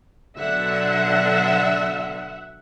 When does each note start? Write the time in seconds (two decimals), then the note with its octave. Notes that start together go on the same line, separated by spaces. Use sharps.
0.38 B2 D3 F#3 E5 F#5